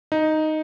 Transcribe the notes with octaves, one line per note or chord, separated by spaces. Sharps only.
D#4